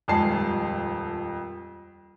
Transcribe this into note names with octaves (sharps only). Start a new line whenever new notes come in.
D#1 F2 G#3 A5 C7